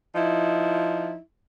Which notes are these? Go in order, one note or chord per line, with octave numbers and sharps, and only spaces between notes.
F3 D#4 E4